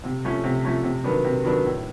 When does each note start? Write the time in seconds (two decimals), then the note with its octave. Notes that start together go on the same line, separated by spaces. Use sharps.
0.04 C3
0.25 F3 A3 C#4
0.44 C3
0.65 F3 A3 C#4
0.83 C3
1.04 D#3 F#3 B3 D4
1.24 C3
1.43 D#3 F#3 B3 D4
1.64 A2